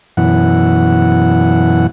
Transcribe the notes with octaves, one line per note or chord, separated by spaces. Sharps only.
F#2 B2 E3 F#5